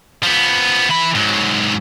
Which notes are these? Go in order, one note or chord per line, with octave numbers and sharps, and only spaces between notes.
F3 B3
E3 B5
G#2 F#3